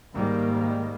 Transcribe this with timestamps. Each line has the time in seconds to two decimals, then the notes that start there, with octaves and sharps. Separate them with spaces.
0.14 G#2 D#3 G3 A#3